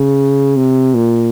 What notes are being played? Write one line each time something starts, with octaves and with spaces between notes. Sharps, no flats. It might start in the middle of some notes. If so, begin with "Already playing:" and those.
Already playing: C#3
C3
A#2